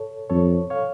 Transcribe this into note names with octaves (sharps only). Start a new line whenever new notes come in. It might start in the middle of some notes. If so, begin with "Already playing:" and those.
Already playing: A4 C#5
F2 A4 C#5
C#5 F5